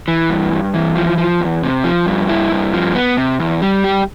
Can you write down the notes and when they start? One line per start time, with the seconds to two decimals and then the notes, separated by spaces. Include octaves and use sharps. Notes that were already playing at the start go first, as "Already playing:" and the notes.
0.08 E3
0.30 G2
0.53 G2
0.74 E3
0.96 F3
1.18 F3
1.41 E2
1.63 C3
1.84 F3
2.06 G2
2.29 E4
2.52 G2
2.74 F3
2.95 B3
3.17 C3
3.39 E2
3.62 G3
3.84 G4